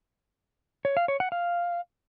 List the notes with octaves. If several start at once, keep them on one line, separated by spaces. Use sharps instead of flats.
C#5
F5
C#5
F#5
F5